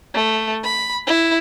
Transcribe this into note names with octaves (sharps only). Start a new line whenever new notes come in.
A3
B5
E4